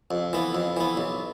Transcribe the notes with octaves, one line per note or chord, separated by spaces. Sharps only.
F2
E3 B3
F2
E3 B3
B1